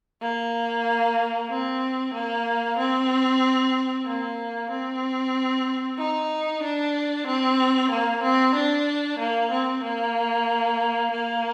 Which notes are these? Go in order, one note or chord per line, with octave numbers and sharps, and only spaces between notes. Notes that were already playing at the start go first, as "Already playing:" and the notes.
A#3
C4
A#3
C4
A#3
C4
D#4
D4
C4
A#3
C4
D4
A#3
C4
A#3
A#3